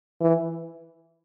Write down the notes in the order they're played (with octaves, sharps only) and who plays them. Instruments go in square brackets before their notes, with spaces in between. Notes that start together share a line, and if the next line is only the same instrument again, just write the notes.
[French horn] E3